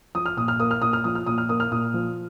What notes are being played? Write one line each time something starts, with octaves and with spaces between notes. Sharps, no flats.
F3 D#6
F6
A#2 D#6
F6
A#3 D#6
F6
A#2 D#6
F6
F3 D#6
F6
A#2 D#6
F6
A#3 D#6
F6
A#2 D#6
F3